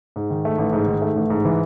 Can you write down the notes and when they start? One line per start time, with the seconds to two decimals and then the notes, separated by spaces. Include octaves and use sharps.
0.16 G#2
0.30 D#3
0.45 A3
0.58 A1
0.73 G#2
0.87 D#3
1.02 A3
1.16 A1
1.30 G#2
1.45 E3